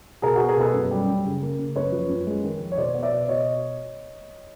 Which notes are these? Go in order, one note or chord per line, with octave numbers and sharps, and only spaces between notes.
B2 G#4 A#4
B3 F#4 G#4
G#4 A#4
B2 A4 B4
F#2
G3
F#2
C#3
A#3
C#3
F#2 B4 C#5
F3
F#2
G#3
D#3
F2
C#5
B2 C5 D5
B3
D5 E5
B2
B2 C#5 D#5